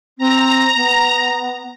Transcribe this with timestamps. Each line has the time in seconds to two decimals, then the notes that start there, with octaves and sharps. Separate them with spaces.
0.18 C4 A#5
0.76 B3